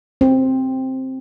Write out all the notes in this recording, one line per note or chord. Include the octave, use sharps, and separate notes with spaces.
C4